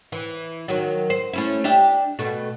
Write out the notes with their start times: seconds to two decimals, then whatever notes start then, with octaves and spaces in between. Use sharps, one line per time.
0.12 E3
0.68 D#3 F#3
1.10 C5
1.33 A3 C#4 E4
1.64 D4 G4 E5
2.19 B2 A3